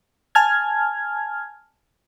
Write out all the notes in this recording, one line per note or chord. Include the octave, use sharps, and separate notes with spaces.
G#5 A5 F6 G#6